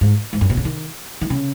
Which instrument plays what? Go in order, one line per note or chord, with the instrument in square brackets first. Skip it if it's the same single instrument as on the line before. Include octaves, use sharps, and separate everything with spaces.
[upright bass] G#2
G#2
F#2
B2
C#3
D#3
D#3
C#3